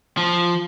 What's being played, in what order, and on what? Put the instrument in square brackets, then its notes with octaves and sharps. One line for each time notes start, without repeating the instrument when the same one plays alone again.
[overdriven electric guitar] F3